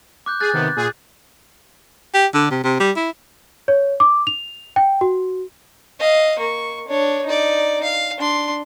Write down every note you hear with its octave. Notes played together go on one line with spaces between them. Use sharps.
D6 F#6 G6
G#4 F#6 A6
C3 D#3 B3
A#2 G#4
G4
D3
C3
C3
G3
E4
C#5
D6
F7
G5
F#4
D#5 F5
A#3 C#6
D4 C#5
D#4 D5
F5
D4 C6